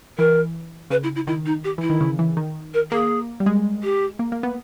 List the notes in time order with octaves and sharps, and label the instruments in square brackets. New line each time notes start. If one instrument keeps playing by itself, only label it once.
[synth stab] E3 [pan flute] A#4
[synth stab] C#3 [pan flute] B4
[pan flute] E4
E4
[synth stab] D#3 [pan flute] E4
[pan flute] D#4
G4
[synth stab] E3 [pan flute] E4
[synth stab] D#3
C#3
E3
D#3
[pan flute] A#4
[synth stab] A#3 [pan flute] G#4
[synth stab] G3
G#3
[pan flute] G4
[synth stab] A#3
A#3
B3